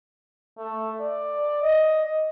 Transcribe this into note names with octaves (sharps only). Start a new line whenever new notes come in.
A3
D5
D#5